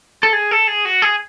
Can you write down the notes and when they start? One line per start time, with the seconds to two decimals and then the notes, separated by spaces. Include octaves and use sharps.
0.23 A4
0.33 G#4
0.51 A4
0.67 G#4
0.85 F#4
1.02 G#4